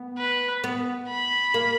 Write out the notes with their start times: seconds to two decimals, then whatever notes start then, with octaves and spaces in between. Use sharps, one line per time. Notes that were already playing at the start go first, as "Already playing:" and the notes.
Already playing: B3
0.18 B4
0.64 B3
1.09 B5
1.54 A#3